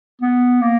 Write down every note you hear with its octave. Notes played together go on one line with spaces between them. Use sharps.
B3
A#3